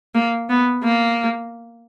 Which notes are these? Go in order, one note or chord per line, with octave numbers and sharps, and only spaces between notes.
A#3
B3
A#3